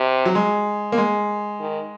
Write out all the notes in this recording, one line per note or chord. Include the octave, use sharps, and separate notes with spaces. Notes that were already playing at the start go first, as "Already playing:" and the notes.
Already playing: C3
F#3
G#3
A#3
G#3
D#3